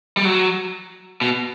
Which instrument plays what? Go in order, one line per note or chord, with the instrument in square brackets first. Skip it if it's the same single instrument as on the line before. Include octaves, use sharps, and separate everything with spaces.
[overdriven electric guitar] G3
F#3
B2